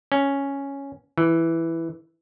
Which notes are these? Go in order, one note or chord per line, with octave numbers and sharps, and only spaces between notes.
C#4
E3